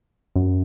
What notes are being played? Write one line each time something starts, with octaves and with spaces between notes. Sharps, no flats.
F#2